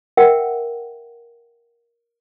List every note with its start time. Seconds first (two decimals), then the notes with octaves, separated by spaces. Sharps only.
0.17 A#4 E5 F#5 G5